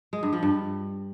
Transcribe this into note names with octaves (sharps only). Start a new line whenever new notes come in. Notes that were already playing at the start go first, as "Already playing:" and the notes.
G#3
G2
F3
G2